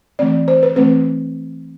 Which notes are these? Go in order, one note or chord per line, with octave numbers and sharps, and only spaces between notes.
E3 A3 C4 D5
C5
B4
E3 A3 C4 B4